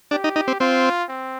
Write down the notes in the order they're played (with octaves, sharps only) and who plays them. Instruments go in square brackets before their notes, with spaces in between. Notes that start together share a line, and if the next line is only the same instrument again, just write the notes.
[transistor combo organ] D4 [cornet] G4
[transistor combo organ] D#4
D#4
C4
[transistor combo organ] C4 [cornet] F4
[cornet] C4